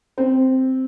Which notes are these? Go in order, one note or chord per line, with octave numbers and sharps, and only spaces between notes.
C4